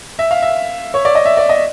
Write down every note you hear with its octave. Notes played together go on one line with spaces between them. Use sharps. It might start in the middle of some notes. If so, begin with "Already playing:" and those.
E5
F5
E5
C#5
D5
D#5
E5
D5
D#5